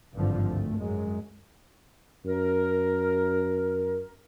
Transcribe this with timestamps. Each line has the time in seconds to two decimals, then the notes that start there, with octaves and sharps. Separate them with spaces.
0.14 G#1 G2 D3 F3
0.49 D2 A3
0.78 F#2 F#3 G#3
2.26 F#2 A#4